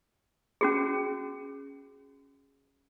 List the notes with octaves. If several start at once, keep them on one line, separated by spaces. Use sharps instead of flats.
C#4 F#4 G#4